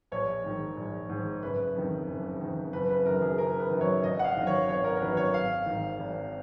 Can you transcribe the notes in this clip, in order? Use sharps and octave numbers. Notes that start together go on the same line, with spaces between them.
A#1 C#5
G#2 D#3
A#1
G#2 D#3
F#1 B4
F2 D#3
F#1
F2 D#3
F#1 B4
B4
F#2 D#3 A#4
G#4
F#1 A#4
B4
D#3
F#2
C#5
G#1 D#5
F#5
F5
F#2 D#3
C#5
G#1 C#5
A#4
A#4
F#2 D#3 B4
C#5
G#1 F5
G#2 D#3
G#1